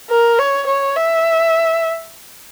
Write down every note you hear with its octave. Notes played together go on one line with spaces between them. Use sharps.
A#4
C#5
C#5
E5